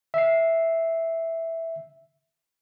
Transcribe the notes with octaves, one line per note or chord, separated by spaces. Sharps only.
E5 C7